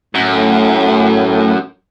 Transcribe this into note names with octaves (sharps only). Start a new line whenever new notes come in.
F#2 A2